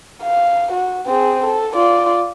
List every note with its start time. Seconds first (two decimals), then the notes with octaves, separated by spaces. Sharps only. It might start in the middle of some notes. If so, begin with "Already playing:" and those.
0.24 F5
0.72 F#4
1.06 C4 G#4
1.45 A4
1.75 F4 D5